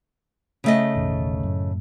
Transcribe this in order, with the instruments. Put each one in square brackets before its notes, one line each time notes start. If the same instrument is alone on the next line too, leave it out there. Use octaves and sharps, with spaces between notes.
[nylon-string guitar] C#3 A3 D#5
[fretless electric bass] E1 A1 D#3
F#2 A2